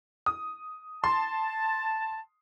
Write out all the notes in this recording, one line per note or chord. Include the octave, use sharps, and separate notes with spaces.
D#6
A5 C6